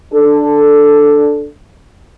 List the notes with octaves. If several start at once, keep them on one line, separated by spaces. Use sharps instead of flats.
D4 A4